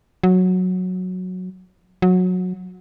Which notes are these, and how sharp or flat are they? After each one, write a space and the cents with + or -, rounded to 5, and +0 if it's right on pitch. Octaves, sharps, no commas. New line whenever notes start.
F#3 -10
F#3 -20